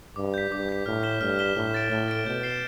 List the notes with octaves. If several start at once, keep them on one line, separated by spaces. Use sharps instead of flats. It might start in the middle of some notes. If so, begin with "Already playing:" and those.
G2 D6
G6 B6
G2 D6
G6 B6
A2 F6
B6 E7 G7
G2 F6
B6 E7 G7
A2 F6
A6 D7
A2 F6
A6 D7
B2 G6
C7 E7 G7